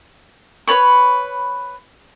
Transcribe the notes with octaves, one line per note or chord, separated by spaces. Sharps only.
B4 C#5 B5 C#6